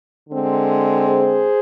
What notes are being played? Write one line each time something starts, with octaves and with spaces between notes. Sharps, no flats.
D3 G#3 C4
G#4 C5